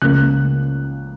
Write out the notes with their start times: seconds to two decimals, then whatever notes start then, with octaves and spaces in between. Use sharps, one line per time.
0.01 C#2 C#3 A#3 F#6